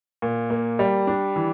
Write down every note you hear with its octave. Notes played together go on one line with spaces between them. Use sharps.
A#2
A#3
G3
D4
E3